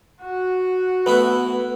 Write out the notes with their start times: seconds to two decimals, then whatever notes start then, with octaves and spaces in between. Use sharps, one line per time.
0.22 F#4
1.06 A3 B3 E4 B4